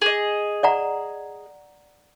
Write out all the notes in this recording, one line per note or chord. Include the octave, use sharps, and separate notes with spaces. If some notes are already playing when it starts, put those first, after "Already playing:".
G#4 D#5
D5 F#5 A#5